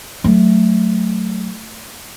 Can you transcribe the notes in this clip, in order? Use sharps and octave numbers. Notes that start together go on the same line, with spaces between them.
F#3 A3